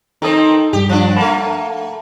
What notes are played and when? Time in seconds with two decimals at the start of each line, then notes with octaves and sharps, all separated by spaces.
0.22 D#3 C4 D#4 A4 D#6
0.73 G2 G3 G4
0.89 F3 D4
1.16 A3 A#3 F#5 A5 B5